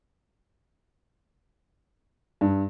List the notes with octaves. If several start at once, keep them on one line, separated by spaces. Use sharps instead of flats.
G2